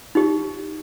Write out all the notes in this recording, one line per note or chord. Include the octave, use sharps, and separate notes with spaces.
D#4 G4